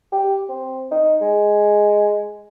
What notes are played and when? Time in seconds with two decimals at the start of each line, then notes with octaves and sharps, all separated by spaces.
0.12 G4
0.49 C4
0.91 D#4
1.21 G#3